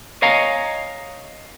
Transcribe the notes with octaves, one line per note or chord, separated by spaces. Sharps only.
C#5 D#5 F5 G#5 A#5